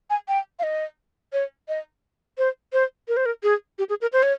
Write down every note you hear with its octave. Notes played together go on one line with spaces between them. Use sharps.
G#5
G5
F5
D#5
C#5
D#5
C5
C5
A#4
C5
A#4
G#4
G4
G#4
A#4
C5
C#5